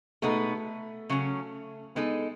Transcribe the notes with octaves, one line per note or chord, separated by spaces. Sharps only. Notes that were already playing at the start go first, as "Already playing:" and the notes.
B2 G#3 A3 B3 D#4
C#3 F#3 C#4
G#3 B3 D#4 A4